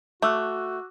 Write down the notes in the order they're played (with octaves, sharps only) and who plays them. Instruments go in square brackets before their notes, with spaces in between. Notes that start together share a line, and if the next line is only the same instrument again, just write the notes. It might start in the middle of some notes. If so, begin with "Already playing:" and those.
[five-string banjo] A3 [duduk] F#4 [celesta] D6 E6 F#6